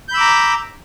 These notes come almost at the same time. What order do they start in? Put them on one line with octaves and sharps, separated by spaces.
G6 B5 E6 D6 A#5